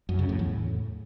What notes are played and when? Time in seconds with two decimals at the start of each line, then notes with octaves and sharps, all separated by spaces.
0.09 F#2
0.19 C#3
0.29 A2
0.39 E2
0.49 A2